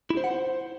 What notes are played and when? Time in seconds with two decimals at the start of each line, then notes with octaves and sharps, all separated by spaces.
0.10 E4
0.17 C5
0.24 F#5
0.31 C5